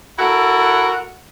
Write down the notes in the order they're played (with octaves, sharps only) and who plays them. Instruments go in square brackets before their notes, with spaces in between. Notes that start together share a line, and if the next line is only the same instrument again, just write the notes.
[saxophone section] E4 F#4 A4 A#4